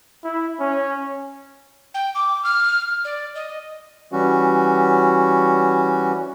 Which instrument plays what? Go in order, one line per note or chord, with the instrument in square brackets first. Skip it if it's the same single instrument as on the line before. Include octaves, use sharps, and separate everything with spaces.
[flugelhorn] E4
C#4
[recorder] G5
D6
F6
D5
D#5
[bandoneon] E3 G3 C#4 F#4